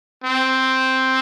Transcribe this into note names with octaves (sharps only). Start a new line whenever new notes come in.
C4